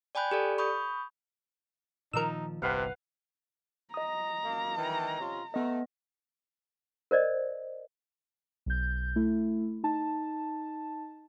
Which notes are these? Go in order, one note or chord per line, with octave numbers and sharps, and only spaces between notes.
D5 G5 G#5 B5 F#6 G6
G4 A4 D5
B5 C#6 D#6 G6
A#2 D#3 F3 D#4 A#4 E6
G1 C2 C3 B4 F5 F#5
D#5 A#5 D#6
F#2 A#3
D#3 E3
C3 C#4 F4
A3 B3 D#5
A#4 C5 D5 D#5
B1 G6
A3 E4
D#4 A5